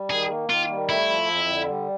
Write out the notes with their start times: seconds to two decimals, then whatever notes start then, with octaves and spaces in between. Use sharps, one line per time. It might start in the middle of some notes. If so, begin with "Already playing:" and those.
Already playing: G3
0.10 D#3 G#4
0.30 A#3
0.49 D#3 F4
0.70 G3
0.89 A3 E4
1.09 F3
1.28 F2
1.48 D3
1.68 G3